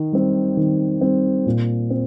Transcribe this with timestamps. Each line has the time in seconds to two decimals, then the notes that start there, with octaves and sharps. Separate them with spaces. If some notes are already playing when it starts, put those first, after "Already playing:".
Already playing: D#3
0.13 G3 C4
0.57 D#3
1.01 G3 C4
1.46 A#2
1.90 C4